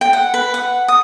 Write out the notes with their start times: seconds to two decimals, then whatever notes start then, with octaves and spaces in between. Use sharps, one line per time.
0.01 G5
0.13 F#5
0.34 B4
0.54 F#5
0.88 D#6